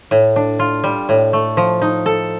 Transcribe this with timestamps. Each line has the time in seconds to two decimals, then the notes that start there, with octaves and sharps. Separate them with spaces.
0.11 A2
0.36 D4
0.59 F4
0.84 G3
1.09 A2
1.33 A3
1.57 F3
1.81 D#4
2.06 A4